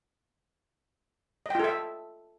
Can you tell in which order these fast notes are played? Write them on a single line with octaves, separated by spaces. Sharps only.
D#5 G5 F4 A4 E5